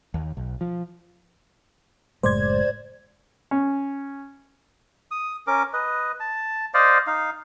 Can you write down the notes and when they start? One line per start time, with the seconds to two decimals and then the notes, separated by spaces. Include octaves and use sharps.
0.14 D#2
0.37 B1
0.61 F3
2.23 F#1 A2 G#3 C5 D5 G#6
3.51 C#4
5.11 D#6
5.47 C#4 A#4 D6
5.73 B4 D#5
6.20 A5
6.74 C5 D5 D#5 F5
7.07 D#4 F5